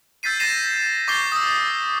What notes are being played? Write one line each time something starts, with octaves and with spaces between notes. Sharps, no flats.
E6 G6 A6 B6 C7 D#7
A6 A#6 C7 D#7 E7
C#6 D6 G6 A6 C7 G7
D#6 E6